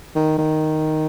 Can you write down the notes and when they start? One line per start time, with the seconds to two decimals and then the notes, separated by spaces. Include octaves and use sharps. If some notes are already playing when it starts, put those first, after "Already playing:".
0.16 D#3
0.38 D#3